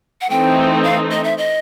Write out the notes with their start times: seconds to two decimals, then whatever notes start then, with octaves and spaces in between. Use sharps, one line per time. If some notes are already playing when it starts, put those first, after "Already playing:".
0.21 F#5
0.29 E3 A3 C4 D#4 G5
0.84 F5
1.11 D#5
1.24 E5
1.38 D#5